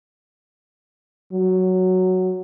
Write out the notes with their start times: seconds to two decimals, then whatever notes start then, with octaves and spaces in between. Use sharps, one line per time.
1.33 F#3